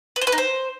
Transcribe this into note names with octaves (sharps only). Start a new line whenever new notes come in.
B4
C5
B4
D#4
C5